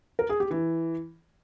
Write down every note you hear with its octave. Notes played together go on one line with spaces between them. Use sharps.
A#4
G#4
G4
E3